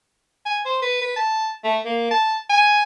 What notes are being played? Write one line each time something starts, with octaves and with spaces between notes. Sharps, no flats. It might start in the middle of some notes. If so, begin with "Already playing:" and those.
G#5
C5
B4
B4
A5
A3
A#3
A5
G#5